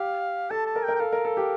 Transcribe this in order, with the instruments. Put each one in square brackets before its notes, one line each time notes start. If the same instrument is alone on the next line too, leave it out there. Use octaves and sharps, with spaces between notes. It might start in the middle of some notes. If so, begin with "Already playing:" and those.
Already playing: [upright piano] G4 [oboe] F5
[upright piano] A4 [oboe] A5
[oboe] A5
[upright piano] A#4
[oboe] G5
[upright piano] A#4
[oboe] G5
[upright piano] A4 [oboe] F5
[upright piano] A#4
A4
G4